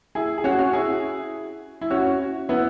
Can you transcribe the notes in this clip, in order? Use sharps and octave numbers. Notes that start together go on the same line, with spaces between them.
E4 G#4
G#4
C#4 F#4
C#4 F#4
E4 G#4
E4
C#4 F#4
B3 E4